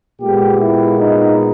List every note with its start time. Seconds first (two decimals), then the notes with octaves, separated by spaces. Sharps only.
0.21 A#2 G#3 B3 G4
0.60 E4
1.00 D#4